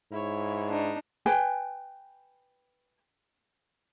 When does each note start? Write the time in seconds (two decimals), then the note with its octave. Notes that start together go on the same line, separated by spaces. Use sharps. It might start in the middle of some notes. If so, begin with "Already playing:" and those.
0.12 G#2 E4 C#5
0.68 D4 D#4
1.26 B4 G5 G#5